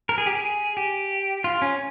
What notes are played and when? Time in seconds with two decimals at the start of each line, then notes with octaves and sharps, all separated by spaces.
0.09 A#4
0.18 G#4
0.26 G4
0.35 G#4
0.77 G4
1.44 F4
1.62 C#4